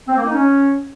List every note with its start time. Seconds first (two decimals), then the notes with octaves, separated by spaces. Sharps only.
0.08 C4
0.16 A#3
0.24 D#4
0.33 C#4